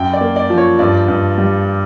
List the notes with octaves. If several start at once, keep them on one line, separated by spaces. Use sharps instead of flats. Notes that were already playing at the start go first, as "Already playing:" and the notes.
Already playing: F#2 G5
D5
A#3
D5
F3
C#5
G2 D5
G2
G3